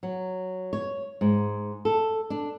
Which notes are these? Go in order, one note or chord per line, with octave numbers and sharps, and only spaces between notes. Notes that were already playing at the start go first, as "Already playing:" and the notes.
F#3
C#5
G#2
A4
D4